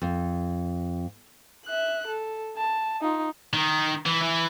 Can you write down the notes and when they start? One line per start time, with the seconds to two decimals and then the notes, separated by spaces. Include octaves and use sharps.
0.02 F2
1.66 E5 F#6
2.07 A4
2.56 A5
3.01 D#4 F4
3.53 D#3
4.06 E3
4.22 E3